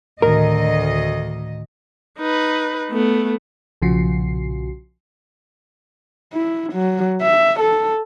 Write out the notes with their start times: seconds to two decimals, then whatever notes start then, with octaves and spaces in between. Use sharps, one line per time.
0.22 D2 A2 D#3 A#4 D#5
2.18 D#4 B4
2.91 A3 B3
3.82 B1 A#2 C#3 F3 F#4 C7
6.33 E4
6.73 F#3
7.21 E5
7.60 A4